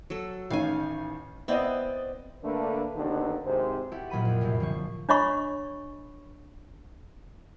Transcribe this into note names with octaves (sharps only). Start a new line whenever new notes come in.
F#3 A4
A1 D#3 C#4 F5 G#5
B3 C4 E4 D5 D#5
D3 A3 A#3 D4 A4 B4
A1 D#2 B2 D3 D4 D#4
G#1 G#2 C3 C5
E4 F#4 G4 A4
A#1 A#2 F#3 B5 D#7
F2
C2 F#2 A2
D3 F3 C#6
D4 C#5 D#5 B5 C#6